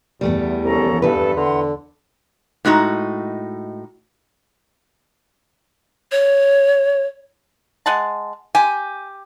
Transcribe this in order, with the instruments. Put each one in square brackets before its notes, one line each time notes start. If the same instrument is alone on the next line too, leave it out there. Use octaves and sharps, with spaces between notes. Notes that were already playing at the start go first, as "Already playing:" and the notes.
[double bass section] E2 [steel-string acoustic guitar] G3 A3 B3
[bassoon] C2 [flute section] C#4 A4 A#5
[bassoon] G2 [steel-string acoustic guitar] E3 B4 [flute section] A4
[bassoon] D3 [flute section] F#5 A#5 C6
[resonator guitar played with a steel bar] A2 G#3 D#4 F#4 A#5
[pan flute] C#5
[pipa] G#3 F#5 A5
[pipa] G4 [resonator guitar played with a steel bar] G#5